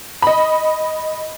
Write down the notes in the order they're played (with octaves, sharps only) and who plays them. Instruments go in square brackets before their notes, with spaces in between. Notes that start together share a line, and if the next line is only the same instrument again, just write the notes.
[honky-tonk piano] D#5 B5